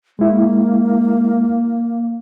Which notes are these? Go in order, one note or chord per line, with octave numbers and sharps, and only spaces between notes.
G#3 A#3 E4